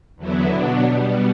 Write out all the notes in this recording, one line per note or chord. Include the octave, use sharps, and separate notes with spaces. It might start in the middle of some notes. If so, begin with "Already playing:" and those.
E2 D3 F#3 B3 E4
B2 F#3 B3 D4
B2 G3 B3